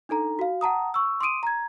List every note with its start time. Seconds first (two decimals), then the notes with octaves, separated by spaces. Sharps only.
0.09 D4 D#4 A4 A#5
0.39 F#4 F5
0.61 F#5 A5 A#5 D#6
0.94 C#6 E6
1.21 C6 D6 D#6 D7 D#7
1.43 A#5 G#6